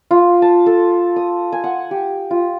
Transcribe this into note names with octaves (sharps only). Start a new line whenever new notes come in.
F4
A5
A4
D#6
G#5
F#5
G4
F4